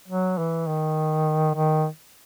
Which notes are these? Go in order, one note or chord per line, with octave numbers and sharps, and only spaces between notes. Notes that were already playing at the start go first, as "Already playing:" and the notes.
F#3
E3
D#3
D#3